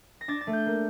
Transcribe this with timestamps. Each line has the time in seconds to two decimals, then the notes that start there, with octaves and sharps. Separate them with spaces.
0.21 A#6
0.28 D4 A6
0.41 A6
0.47 A3
0.53 G6
0.66 A#3